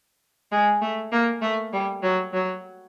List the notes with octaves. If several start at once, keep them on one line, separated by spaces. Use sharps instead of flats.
G#3
A3
A#3
A3
G3
F#3
F#3